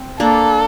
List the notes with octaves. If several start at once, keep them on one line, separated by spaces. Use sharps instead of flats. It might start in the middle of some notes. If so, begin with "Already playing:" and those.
Already playing: C4
A#3 D4 A4